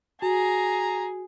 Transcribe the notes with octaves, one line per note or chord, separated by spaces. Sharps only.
F#4 G#4 A#5